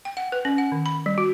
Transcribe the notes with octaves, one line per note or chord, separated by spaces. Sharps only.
G5
F#5
B4
C#4
F#5
D#3
B5
G3
F#4